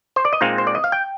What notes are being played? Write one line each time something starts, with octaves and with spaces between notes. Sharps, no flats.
C5
D5
D#5
A#2 G#3 C4 D#4 F5
C5
D5
D#5
F5
G5